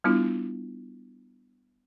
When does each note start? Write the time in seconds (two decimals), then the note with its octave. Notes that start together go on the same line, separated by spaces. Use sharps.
0.04 G3 B3 D4 E4 F4